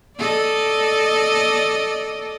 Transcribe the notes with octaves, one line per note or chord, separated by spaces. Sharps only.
A4 D5 D#5